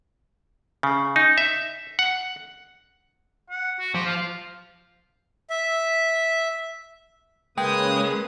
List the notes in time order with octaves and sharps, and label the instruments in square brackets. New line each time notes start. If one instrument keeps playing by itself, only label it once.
[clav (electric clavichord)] C#3
D#4
E5
F#5
[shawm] F#5
F#4
[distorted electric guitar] F3 [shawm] G4
[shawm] F5
[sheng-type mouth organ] E5
[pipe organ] C#3 D#6 [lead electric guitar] G#3 [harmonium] A#3 B4 [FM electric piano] G5